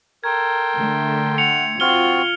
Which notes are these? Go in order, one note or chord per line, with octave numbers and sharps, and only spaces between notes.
A4 A#4 G5 C6 G#6
D3 A3
F#5 C#7 F7
C4 F4 F#4 F6 G7